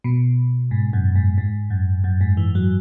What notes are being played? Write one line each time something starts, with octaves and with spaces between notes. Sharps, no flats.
B2
G#2
F#2
G#2
G#2
F#2
F#2
G#2
E3
F#3